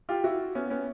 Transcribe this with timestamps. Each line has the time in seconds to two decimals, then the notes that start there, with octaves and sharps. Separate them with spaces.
0.09 F4 G4
0.24 E4 F#4
0.55 B3 C#4
0.70 B3 C#4